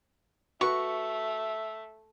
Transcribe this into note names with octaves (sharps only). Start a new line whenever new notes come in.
A3 F#4 B4 E5 C#6